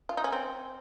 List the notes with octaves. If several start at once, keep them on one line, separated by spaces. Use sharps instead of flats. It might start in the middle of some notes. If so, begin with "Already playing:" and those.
F4
D#4
C#4
C4